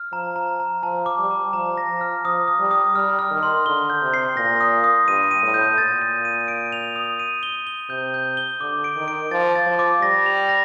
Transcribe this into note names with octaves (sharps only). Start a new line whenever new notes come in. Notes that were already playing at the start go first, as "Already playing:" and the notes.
Already playing: F6
F3 A#5
A#5
A#5
F3 A5
D6
G3
A5
F3 A#5
A#6
F3
F6
F3 D#6
D#6
G3
D#6
G3 F6
F6
D#3
C6
D3 G7
G6
C3
C7
A#2 A#6
D#6
D#6
G2 D#7
D#7
A2
G6
A#2 A6
D#7
D#7
D7
F7
D#6
D#7
G7
G7
C3 G6
G6
G7
D3 D6
D7
D#3
D7
F3 A6
A6
F3
D6
G3 A#6
F7
A#6